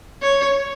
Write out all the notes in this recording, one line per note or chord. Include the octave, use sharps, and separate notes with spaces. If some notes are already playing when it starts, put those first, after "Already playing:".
C#5